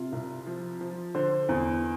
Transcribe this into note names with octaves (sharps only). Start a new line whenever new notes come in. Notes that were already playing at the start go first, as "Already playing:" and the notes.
Already playing: C3 F4
C2
F3
F3
D3 C5
E2